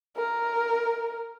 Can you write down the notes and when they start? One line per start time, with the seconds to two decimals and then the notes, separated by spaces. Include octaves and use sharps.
0.16 A#4